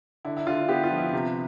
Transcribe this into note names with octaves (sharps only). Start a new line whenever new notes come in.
D3 E4
E4
D3 F4
B3 G4
F4
F3
E4
C3